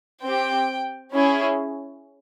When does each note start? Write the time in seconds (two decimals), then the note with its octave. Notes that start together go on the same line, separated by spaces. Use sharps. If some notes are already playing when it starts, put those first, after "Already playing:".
0.22 C4 G4 G5
1.12 C#4 E4 G#4